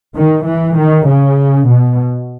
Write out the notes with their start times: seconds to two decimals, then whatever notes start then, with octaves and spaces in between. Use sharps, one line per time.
0.16 D#3
0.46 E3
0.77 D#3
1.07 C#3
1.67 B2